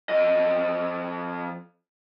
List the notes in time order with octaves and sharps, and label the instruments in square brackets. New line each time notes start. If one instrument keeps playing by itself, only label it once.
[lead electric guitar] F2 D#5